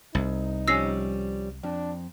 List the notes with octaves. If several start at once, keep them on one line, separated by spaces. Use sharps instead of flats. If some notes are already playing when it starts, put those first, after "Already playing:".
C2 D#4
F3 G3 C#4 E6 A#6 C7
F2 D4